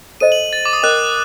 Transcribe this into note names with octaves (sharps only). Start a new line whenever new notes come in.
A4 C5 D#5 D#7
F#7
A6
D6
D#6
A#4 D#5 G5 F#6